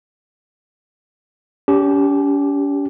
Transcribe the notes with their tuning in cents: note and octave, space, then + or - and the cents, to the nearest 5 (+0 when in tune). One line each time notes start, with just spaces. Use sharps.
C#4 +45 G4 +0